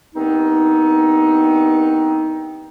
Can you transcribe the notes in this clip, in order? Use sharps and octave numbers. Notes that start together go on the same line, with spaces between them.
G2 D#3 B3 C4 D#4